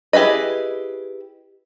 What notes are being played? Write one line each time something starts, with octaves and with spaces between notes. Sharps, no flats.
E4 G4 G#4 B4 D#5